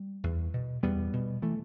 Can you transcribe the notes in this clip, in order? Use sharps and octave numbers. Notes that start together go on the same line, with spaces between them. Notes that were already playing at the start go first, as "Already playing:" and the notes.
Already playing: G3
E2
B2
E2 G3 B3
B2
E3 A3